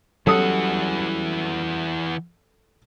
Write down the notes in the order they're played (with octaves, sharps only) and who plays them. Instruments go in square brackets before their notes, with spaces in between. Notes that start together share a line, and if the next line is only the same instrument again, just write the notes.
[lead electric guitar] E3 F#5 [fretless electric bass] F#3 G3 C#4 [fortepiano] A4 D#6